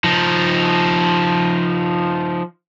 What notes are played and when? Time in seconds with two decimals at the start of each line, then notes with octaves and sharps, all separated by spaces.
0.04 F3 D#4